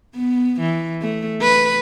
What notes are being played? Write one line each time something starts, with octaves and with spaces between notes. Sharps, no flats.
B3
E3
A3
B4